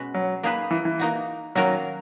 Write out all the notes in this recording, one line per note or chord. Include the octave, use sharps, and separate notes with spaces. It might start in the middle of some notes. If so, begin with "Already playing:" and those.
Already playing: B2 G#3 C#4 F#4 B4
F#3
A#3 D#4 G#4 B4
E3
E3
A#3 D#4 F#4
D#3 F#3 A#3 C#4 F#4 A#4